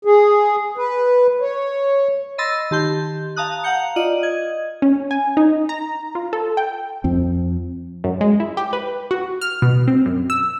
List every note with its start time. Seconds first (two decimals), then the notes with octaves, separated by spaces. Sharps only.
0.05 G#4
0.78 B4
1.41 C#5
2.38 D#5 B5 C6 E6 A6 A#6
2.71 D#3 G4 A5 C6 G6
3.36 F5 A5 A#5 D#6 F#6
3.64 F5 F#5 A#5 G6 C#7
3.96 F4 D5 D#5 D#7 F#7
4.23 D#5 G#6
4.82 C#4
5.11 G#5
5.37 D#4
5.69 A#5
6.15 F4
6.33 A4
6.57 G5
7.04 F2 F3 C4
8.04 F#2
8.21 G#3
8.40 E4
8.57 G4
8.73 B4
9.11 F#4
9.41 F6
9.62 B2
9.88 C4
10.06 F#2
10.30 E6